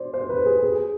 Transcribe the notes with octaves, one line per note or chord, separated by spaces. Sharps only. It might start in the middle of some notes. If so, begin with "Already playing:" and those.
Already playing: C5 D5
C5
B4
G#4
G#4